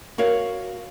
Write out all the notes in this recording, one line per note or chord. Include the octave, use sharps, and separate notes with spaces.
F#4 A#4 C#5 F5